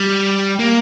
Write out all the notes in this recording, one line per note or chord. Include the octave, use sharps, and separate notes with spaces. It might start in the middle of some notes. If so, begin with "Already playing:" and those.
Already playing: G3
A#3